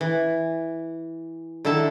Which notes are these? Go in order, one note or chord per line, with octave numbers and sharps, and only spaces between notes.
E3
D3 D#3 E4 A4 A5